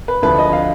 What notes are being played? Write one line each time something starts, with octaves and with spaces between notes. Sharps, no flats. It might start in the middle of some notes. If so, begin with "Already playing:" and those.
B4
D2 D3 F3 B4
D#5
F5